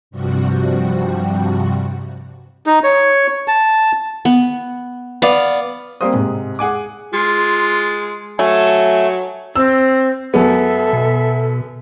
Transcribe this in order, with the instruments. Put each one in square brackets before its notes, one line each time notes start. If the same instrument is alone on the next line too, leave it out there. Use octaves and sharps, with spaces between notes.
[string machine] G2 C3 F3 G3 F#4
[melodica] D#4
C#5
A5
[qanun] B3
[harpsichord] B3 D5 [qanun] F5
[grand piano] G3 A#3 C4 C5 D#6
G#2 C3
G#4 F#5 G#5 D6
[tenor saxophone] G#3 [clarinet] F4
[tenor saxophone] F#3 [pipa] A3 [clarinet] G#5
[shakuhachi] C4 [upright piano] E6
[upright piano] F#2 B3 [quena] A4 [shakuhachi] E5
[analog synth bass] B2